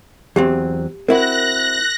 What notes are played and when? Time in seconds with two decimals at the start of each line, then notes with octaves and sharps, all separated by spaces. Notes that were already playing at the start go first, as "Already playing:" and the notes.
0.36 E2 F#3 C4 G4
1.08 C4 E4 F#4 A#4 F#6 A#6